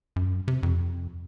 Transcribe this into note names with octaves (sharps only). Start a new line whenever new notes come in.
F#2
C3
F2